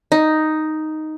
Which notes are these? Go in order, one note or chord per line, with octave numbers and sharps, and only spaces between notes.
D#4